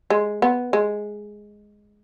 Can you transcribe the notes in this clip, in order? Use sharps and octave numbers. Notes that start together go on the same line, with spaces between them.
G#3
B3
G#3